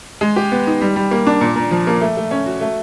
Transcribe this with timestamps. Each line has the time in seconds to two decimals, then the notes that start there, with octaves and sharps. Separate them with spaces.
0.21 G#3
0.36 G4
0.52 B3
0.67 D#4
0.81 G3
0.96 G3
1.11 A#3
1.27 D4
1.41 A#2
1.56 A#2
1.71 F3
1.87 A#3
2.01 A3
2.17 A3
2.31 C#4
2.46 F#4
2.61 A3